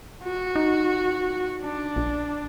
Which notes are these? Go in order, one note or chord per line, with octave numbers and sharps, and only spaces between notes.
F#4
D#4
D4
A#1